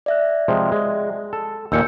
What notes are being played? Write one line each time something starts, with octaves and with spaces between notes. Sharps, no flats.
D5 E5 F#6
C3 F3 G#3
G#3
A4
D#2 A#2 A#3 E6 G6 C#7